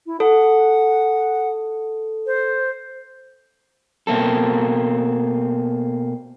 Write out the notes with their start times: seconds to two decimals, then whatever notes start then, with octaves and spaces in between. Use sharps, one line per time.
0.06 E4
0.20 A4 F#5
2.26 C5
4.07 B2 A#3 C4 A4